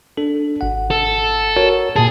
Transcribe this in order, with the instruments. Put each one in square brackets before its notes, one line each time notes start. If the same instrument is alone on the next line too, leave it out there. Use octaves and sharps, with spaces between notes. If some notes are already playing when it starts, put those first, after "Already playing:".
[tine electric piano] D4 A4
G#1 F#5
[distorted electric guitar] A4
[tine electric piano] F#4 A#4 C#5
[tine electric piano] A#2 A5 [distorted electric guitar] G#4